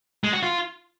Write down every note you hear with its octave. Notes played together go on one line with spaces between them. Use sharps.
G#3
F#4
F4